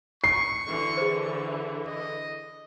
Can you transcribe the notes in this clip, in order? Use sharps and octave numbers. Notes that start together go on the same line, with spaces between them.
C#6 C7
D3 E3
G#4 C5
D#5